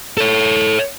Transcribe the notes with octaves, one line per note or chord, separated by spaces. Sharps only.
A4 C#5